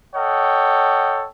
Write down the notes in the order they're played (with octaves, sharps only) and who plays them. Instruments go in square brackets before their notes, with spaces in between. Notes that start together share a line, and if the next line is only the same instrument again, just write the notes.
[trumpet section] A4 C#5 D#5 F#5 G5